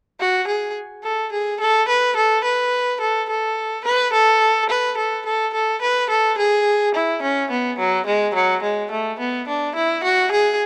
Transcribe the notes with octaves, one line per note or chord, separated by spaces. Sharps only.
F#4
G#4
A4
G#4
A4
B4
A4
B4
A4
A4
B4
A4
B4
A4
A4
A4
B4
A4
G#4
E4
C#4
B3
F#3
G#3
F#3
G#3
A3
B3
D4
E4
F#4
G#4